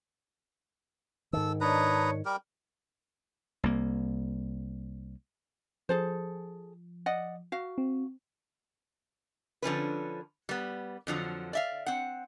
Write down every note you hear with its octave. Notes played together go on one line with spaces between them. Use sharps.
G#2 D#3 A4 E6
D4 D#4 B4 C#5 A#5
G3 G4 A#4
C2 A#3
F3 G#4 A4 C5
D5 D#5 F#5
F#4 F5
C4
D3 F3 C#4 B4
G3 B3
F2 D3 F3 F#3
D5 E5 F5
C4 F#5